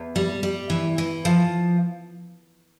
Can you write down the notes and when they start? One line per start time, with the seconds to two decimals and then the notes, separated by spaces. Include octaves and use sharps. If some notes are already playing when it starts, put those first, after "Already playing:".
Already playing: E2
0.16 G3
0.43 G3
0.70 E3
0.98 E3
1.25 F3